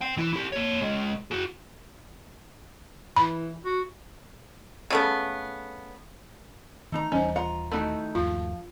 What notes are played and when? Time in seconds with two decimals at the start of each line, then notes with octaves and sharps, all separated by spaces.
0.01 C5 G5
0.17 E3 E4
0.33 E4 G4
0.52 A#3 C#5
0.81 C#2 G#3
1.31 F#4 G#4
3.16 E3 B5
3.65 F#4
4.90 C#3 A3 B3
6.92 D#3 A3 D#4 A#5
7.12 D#1 E3 G3 C#4 D4 C5
7.36 F4 F#5 A#5
7.72 D#3 A3 D#4 E4 F#4
8.15 G1 D#2 F3 F4